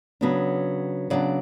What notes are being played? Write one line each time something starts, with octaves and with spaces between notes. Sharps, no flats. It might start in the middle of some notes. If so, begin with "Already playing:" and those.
C#3 F#3 B3 D4
C#3 F#3 B3 D4 D5